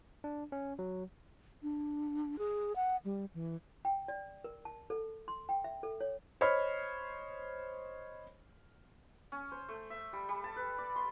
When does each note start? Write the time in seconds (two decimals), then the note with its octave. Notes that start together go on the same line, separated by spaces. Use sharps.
0.24 D4
0.52 C#4
0.79 F#3
1.63 D4
2.39 G#4
2.76 F#5
3.05 G3
3.34 E3
3.85 G5
4.08 D5
4.44 A#4
4.65 A5
4.90 A4
5.28 C6
5.49 G5
5.64 E5
5.83 A4
6.01 C#5
6.41 C5 C#5 D#5 B5 F6
9.32 C#4
9.52 C5
9.68 A3
9.90 E5
10.13 G3
10.29 G3
10.44 A5
10.56 B4
10.78 D5
10.96 C6